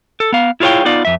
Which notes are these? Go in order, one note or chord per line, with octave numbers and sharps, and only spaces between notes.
A4
B3 F5
E4 F4 G#4 C#5 F5 G5
B3 D#4 F4 D5 F5
F2 E5